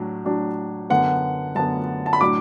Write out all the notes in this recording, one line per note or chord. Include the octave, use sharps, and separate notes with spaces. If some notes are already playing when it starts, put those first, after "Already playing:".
Already playing: A2 F#3 D4
A2 F#3 D4
F#2 D3 B3 F#5
F#2 D3 B3 A5
A5
B5
A2 F#3 D4 D6